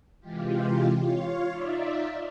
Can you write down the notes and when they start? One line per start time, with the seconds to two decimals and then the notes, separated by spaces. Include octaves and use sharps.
0.20 C3 E3 G#3 F4 G4
0.98 F4 C#5 F5
1.51 D#4 F4 D5 E5